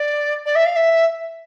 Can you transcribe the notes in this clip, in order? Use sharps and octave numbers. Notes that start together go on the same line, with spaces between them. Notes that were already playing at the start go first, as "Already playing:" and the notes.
Already playing: D5
D5
E5
F5
E5